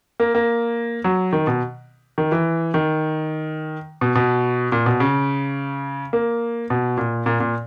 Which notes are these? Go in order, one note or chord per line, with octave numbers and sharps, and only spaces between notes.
A#3
A#3
F#3
D#3
B2
D#3
E3
D#3
B2
B2
A#2
B2
C#3
A#3
B2
A#2
A#2
A#2